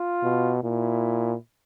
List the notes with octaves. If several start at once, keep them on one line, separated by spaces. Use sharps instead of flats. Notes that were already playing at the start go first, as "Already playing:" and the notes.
Already playing: F4
B2
A#2 E4